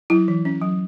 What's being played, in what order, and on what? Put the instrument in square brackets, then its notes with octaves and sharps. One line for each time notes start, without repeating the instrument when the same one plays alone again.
[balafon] F#3 E4
E3
C#4
F#3